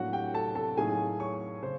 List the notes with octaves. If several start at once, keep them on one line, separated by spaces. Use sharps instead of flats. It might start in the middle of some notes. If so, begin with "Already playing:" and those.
Already playing: A2 F#3 A#3 D4 F#4 F#5
G4 G5
A4 A5
A4 A5
A2 F#3 A#3 D#4 G#4 G#5
C#5 C#6
C#3 C5